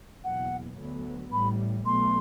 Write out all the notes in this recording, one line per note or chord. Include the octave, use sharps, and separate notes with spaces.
F#1 E2 B2 F#5
D2 D3 F#3 B3
A1 A2 G3 B5
B1 B2 A3 C6